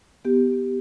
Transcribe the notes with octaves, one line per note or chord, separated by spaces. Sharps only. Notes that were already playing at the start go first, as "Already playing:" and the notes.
B3 G4